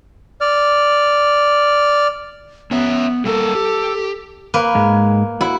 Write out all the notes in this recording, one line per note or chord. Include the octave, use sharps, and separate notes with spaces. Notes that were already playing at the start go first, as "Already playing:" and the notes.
D5 F6
B3 C#4 C#5 E5
G3 A#3 A4 A#4
G4
A#3 B4
G#2 G#3
E4 F#4